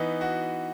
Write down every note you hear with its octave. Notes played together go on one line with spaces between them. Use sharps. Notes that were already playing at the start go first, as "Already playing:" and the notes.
Already playing: E3 B3 D#4
F#4